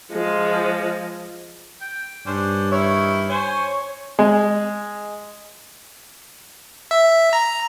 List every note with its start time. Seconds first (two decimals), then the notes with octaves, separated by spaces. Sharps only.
0.12 F3 G#3
1.81 G5
2.27 G2 C#4 D4 C5
2.72 D#3 E4 C#5
3.29 C5 C#5 G#5
4.19 G#3
6.91 E5
7.33 A#5